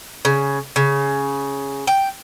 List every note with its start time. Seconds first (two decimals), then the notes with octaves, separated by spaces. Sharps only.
0.25 C#3
0.76 C#3
1.87 G5